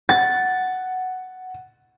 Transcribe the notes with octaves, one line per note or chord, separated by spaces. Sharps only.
F#5 A6